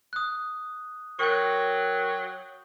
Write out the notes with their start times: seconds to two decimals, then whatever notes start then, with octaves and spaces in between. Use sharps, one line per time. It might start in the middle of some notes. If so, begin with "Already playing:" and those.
0.13 D#6 F#6
1.19 F#3 A#4 G5 C#6 G6